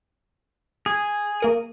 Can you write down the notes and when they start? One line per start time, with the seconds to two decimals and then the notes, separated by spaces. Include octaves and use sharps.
0.86 G#4 G#6
1.40 A#3 A#4 D#7